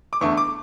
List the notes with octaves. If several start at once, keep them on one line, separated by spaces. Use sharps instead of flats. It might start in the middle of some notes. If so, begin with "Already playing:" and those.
D6
E2 D3 A3 C#6
D6